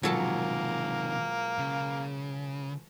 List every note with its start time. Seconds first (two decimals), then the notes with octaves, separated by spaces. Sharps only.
0.03 E1 C3 D#3 F3 F#3 A#3 A4 G#6
1.59 C#3